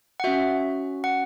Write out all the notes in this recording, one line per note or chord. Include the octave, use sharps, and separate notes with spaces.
F#5
C#4 F#4 E5
F#5